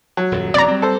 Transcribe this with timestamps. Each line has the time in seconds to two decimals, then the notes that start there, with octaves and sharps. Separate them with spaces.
0.17 F#3
0.32 D#1 F#2
0.54 E1 A#1 C4 D5 A#5
0.68 G3 C4
0.82 A4 C5